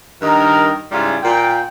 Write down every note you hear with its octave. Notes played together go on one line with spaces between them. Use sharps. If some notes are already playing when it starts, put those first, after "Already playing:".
G2 D#3 D#4 A#4
G#2 C#3 G3 E4 F4 G#4
A#2 G5